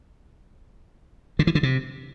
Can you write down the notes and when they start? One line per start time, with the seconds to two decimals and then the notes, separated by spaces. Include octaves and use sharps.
1.39 D3
1.47 E3
1.55 D3
1.63 C3